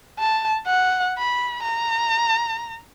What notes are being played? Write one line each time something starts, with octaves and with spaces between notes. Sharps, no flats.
A5
F#5
B5
A#5